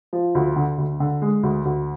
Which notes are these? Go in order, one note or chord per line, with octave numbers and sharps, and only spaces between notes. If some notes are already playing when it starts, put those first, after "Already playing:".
F3
D2
D3
D2
D3
G#3
D2
D2